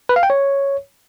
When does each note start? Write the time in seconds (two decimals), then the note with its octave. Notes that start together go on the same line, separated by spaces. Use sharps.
0.09 B4
0.16 F5
0.23 G5
0.30 C#5